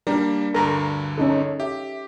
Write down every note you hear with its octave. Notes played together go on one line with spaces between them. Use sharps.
G3 A#3 D4 G4 A#4
D2 G2 D3 A4 A#4 A#5
C#4 D#4 A4
G4 E5